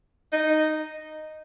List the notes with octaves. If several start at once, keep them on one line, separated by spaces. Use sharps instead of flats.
D#4